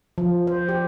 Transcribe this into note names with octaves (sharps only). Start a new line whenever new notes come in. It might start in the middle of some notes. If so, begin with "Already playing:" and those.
F3
C5
G4